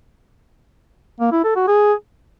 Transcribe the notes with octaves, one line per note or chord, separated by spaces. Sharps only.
A#3
E4
A4
F#4
G#4